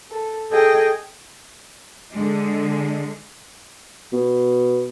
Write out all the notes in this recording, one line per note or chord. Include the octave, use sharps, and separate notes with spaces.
A4
G#4 A4 D#5 G5
D3 G#3
B2